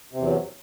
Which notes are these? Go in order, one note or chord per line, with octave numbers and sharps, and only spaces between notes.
E2 C3 F#3